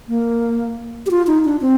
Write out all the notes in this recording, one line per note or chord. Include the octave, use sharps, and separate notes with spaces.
A#3
G4
F4
D#4
D4
C4